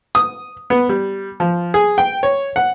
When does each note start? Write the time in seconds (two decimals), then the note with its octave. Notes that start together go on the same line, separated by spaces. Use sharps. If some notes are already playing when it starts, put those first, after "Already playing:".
0.15 D#6
0.70 B3
0.89 G3
1.40 F3
1.74 G#4
1.98 G5
2.23 C#5
2.56 F#5